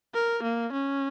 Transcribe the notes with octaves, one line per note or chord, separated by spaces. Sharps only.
A#4
A#3
C#4